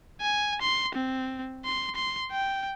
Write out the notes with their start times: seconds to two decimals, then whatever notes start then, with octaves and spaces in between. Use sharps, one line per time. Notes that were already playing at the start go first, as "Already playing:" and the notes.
0.21 G#5
0.62 C6
0.95 C4
1.65 C6
1.96 C6
2.32 G5